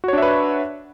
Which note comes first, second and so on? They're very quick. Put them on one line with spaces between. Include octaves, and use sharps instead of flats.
F#4 C#5 D4 E5 B4